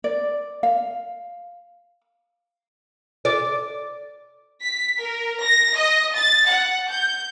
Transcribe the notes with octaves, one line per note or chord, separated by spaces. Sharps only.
D5
F5
D5
B6
A#4
A#6
D#5
A6
F#5
G6